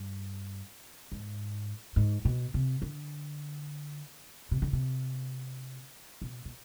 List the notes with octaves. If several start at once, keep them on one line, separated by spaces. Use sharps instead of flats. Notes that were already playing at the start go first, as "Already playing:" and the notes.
Already playing: G2
G#2
G#2
B2
C3
D3
C3
D3
C3
B2
B2